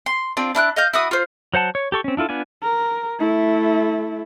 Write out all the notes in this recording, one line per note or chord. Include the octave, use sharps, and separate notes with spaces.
C6
C4 D4 F4
D4 E4 F6 F#6
D#5 F5 G6
E4 F#4 D#6
F4 C5
F#3 C5 F#5 A5
C#5
G4 A4 C#6
C4 C#4
D4 E4 F4 A4
B3 D4 F4 G#5
A#4
A3 E4